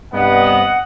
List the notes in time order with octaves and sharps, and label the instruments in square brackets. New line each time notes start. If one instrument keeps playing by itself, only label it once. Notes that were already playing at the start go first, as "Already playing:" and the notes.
[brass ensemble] G2 C3 B3 [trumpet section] D#5 F#5